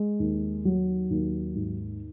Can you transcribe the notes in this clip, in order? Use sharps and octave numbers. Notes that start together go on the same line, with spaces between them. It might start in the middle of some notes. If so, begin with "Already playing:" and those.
Already playing: G#3
D#2
F#3
D#2
G#2